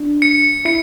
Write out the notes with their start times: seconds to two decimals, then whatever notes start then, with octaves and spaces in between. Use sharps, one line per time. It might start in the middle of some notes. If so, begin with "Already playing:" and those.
Already playing: D4
0.22 C#7
0.65 E4 C#7